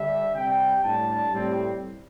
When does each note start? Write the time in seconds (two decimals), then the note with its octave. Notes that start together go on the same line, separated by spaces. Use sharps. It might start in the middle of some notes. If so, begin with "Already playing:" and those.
Already playing: D3 G3 D4 E5
0.35 C3 G3 C4 G5
0.84 A2 G3 D4 A5
1.32 A2 G3 C4